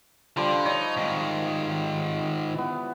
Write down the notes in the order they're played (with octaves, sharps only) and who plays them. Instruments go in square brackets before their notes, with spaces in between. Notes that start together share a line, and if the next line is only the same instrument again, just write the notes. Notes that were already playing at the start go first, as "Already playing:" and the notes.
[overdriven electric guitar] D3 [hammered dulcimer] F3 G3 C6
[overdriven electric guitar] D#4 [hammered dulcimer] C#5 D#5
[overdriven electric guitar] G#2 D#3
[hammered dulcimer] E3 B3